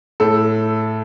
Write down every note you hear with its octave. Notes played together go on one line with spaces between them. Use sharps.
A2 A4